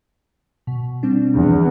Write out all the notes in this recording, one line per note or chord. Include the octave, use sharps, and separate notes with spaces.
B2
G3 C4 D4
E2